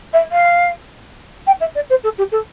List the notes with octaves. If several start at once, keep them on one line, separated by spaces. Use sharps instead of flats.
E5
F5
G5
E5
D5
C5
A4
G4
A4